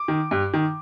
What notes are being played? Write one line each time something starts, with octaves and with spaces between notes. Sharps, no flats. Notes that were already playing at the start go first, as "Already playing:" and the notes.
Already playing: D6
D#3
G2
D#3